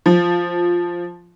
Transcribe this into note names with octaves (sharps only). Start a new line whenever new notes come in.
F3